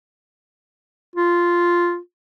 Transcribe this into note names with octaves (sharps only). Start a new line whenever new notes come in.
F4